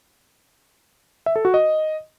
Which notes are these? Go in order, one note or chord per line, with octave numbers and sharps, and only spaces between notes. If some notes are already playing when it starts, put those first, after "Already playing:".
E5
A4
F#4
D#5